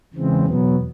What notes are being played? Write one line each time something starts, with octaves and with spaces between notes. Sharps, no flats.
E2 C#3 E3 G#3 C4
E2 B2 F#3 B3